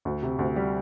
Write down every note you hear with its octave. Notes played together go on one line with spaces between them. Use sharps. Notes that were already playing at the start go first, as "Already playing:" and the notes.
D2
C3
D2
G3